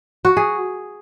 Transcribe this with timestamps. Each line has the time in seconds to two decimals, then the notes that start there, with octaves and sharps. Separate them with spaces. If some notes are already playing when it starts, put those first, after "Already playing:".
0.25 F#4
0.37 G#4